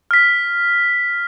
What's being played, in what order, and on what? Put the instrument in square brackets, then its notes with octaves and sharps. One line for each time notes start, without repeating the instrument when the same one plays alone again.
[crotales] F6 B6